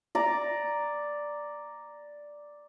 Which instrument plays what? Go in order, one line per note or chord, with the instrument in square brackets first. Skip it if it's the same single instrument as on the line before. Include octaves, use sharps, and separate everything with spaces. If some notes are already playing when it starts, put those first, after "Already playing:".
[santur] D5 A#5